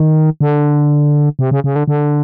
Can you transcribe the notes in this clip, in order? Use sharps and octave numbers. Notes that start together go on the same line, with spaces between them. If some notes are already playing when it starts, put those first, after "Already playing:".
Already playing: D#3
D3
C3
C#3
C#3
D3
D3